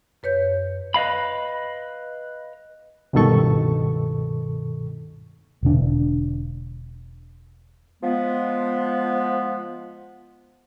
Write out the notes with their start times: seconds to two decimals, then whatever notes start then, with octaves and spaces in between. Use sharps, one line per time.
0.23 F#2 B4 C#5 G6
0.94 B4 D#5 F5 B5
3.13 C#2 G2 B2 D#3 A4 C#6
5.63 E1 D3 D4
8.03 F3 G#3 B3